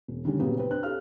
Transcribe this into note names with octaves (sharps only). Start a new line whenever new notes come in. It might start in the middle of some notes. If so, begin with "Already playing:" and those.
E1
D3 D#3 G3 C#4
A#2 C#3 F#3 B3 G4
C4 B4
C4 D4 F#6
G4 A4 C#5 F5 F6